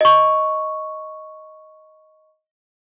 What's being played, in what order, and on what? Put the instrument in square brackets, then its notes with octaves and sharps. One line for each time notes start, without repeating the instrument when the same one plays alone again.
[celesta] D#5 C#6